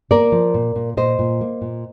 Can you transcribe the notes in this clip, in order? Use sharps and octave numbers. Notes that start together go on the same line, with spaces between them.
A#3 A#4 D5
F3
A#2
A#2
A#2 C5 D#5
A#2
A#3
A#2